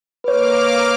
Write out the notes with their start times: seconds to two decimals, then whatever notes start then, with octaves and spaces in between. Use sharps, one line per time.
0.24 A#3 B4 C#5 D6 F6